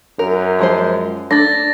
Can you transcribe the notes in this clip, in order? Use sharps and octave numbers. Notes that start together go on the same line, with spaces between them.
F#2 A#4
F3 G#3 C5
A3 D4 A6 A#6